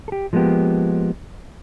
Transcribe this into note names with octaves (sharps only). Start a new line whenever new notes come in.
G4 A4
F3 G#3 A#3 B3 G4